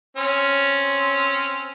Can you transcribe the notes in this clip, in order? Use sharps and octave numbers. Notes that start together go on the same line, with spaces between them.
C4 C#4